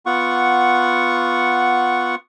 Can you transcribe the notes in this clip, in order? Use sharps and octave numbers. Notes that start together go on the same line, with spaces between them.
B3 F4 F#5 C#6